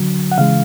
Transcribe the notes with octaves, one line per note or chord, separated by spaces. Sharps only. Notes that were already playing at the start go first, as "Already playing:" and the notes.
Already playing: D3 F#3
F#5
C#3 E3 G#3 F5